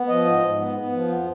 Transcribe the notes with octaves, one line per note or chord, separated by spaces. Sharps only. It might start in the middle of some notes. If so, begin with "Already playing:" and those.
Already playing: B3
F3 D#5
G#2
G#2
B3
B3
F3
F2